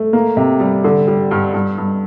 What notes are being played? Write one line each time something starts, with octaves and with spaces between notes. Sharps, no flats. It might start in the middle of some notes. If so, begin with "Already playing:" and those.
Already playing: A3
A#3
C3
G3
D3
G3
G2
G2
G2